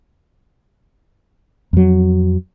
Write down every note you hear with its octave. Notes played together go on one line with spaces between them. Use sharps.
F2 F#3